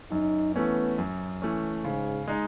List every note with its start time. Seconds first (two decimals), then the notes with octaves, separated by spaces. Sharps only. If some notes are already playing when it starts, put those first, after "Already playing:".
0.12 F#2 D#4
0.55 E3 A3 B3 C#4
0.98 F#2
1.42 E3 A3 C#4
1.84 G#2 C#3
2.28 G#3 D#4